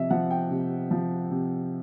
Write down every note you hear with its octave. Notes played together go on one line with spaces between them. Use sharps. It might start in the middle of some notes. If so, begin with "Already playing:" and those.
Already playing: C3 F3 D#5 E5
F3 F#5
G5
C3
F3
C3